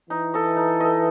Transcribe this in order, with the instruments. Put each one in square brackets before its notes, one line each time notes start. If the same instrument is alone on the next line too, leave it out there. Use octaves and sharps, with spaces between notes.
[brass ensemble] E3 [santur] D#4
[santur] A4 D#5
D#4
A4 D#5